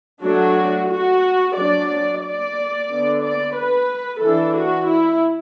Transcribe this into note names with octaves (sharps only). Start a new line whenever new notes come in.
F#3 A3 D4 F#4
F#4
F#3 D4 D5
D5
D3 B3 D4
D5
B4
E3 D4 A4
F#4
E4